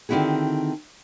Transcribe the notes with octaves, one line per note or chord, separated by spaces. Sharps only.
D3 D#3 C4 E4 F#4 G#4